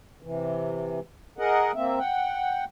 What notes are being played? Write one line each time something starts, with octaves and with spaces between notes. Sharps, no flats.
C3 E3
G#4 A#4 D#5 F#5
A#3 C4 E5
F#5 G5